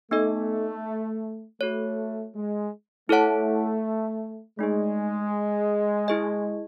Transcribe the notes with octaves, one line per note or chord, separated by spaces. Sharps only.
A3 B3 D#4 A4 D#5
A3 F#4 A4 C#5
G#3
A3 E4 A4 C#5 F#5 A5
G#3 A3 D#4 G#4
E4 G#4 D#5